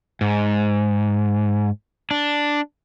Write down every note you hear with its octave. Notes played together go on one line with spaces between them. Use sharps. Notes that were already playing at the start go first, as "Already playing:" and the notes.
G#2
D4